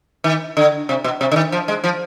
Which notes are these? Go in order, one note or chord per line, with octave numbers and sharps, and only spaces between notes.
D#3
D3
C3
B2
C3
D3
D#3
F3
G#3
F3